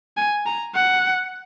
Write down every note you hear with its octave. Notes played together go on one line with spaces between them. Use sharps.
G#5
A#5
F#5